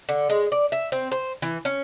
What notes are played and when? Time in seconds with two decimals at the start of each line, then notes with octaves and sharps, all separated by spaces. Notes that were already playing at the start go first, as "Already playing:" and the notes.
0.09 D3
0.30 G#3
0.52 D5
0.72 E5
0.92 C4
1.11 C5
1.42 E3
1.65 C#4